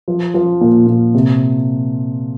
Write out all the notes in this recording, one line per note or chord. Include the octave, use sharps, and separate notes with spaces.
F3
F3
A#2
A#2
C3